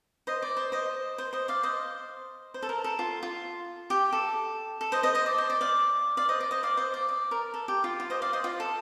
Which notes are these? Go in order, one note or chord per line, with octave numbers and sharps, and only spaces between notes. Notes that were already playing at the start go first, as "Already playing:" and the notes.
C5 D#5
D5
C5
C5 D#5
C5
C5 D#5
D5 F5
C5 D#5
C5
A4
A#4
A4
F4
F4
G4
A4
A4
C5 D#5
C5 D#5
C5 D#5
D5
C5
D5
D5 F5
D5 F5
C5 D#5
D5
C5 D#5
D5 F5
C5 D#5
D5
D5
A#4
A4
G4
F4
F4
C5 D#5
D5 F5
C5 D#5
F4
A4